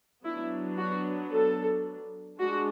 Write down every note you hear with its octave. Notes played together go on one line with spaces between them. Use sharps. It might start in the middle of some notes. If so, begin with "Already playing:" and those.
F#3 B3 D4 E4
F#4
A4
G#3 D4 F#4